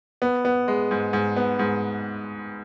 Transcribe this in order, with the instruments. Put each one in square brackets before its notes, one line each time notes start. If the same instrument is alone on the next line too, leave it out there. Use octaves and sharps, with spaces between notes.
[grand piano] B3
B3
G#3
G#2
G#2
B3
G#2